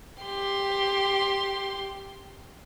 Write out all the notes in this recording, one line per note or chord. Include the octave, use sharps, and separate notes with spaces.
G4 C6